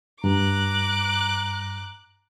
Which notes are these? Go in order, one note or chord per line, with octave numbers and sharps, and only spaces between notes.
G2 A#5 D6 F#6